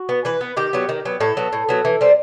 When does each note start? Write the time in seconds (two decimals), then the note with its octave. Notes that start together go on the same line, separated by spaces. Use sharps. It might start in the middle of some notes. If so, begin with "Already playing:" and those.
Already playing: F#4
0.09 B3
0.25 E3 B4
0.41 B3
0.57 D#3 G4
0.73 F#3 B3
0.89 D#3
1.05 F#3 B3
1.21 A2 A4
1.37 F#3 B3
1.53 A2
1.69 F#3 B3
1.85 E3
2.01 G3 C4